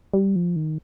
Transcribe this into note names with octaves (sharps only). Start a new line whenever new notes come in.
G3
F3
D#3